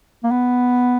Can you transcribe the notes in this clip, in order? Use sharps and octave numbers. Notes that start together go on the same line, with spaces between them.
A#3
B3